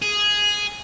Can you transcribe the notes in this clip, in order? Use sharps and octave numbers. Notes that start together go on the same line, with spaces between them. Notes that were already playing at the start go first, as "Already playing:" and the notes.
G#4